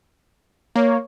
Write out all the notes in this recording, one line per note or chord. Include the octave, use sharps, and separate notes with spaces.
A#3 C#5